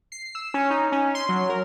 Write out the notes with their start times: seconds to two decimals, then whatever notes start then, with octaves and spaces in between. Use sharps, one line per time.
0.12 C7
0.35 E6
0.54 C#4
0.70 D#4
0.92 C#4
1.15 C6
1.29 F#3
1.49 A#4